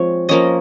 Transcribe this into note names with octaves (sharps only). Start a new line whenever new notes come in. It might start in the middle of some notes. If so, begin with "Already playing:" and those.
Already playing: F3 G#3 C4 C#5
F3 A#3 C#4 D#5